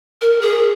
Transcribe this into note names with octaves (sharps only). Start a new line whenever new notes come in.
A#4
G#4